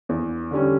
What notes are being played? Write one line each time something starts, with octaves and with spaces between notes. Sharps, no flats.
E2
D3 G3 C#4